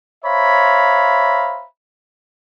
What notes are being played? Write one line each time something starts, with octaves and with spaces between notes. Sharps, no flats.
C5 C#5 E5 F5 A#5 B5